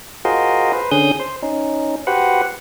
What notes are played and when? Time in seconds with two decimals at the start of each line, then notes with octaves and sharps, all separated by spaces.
0.25 F4 F#4 G#4 A#4 C5 D#5
0.73 B4 C5
0.91 D3 C#4 G#4 D#6 G6
1.20 C5
1.42 C#4 D#4
2.07 F#4 G4 B4 C5 F#5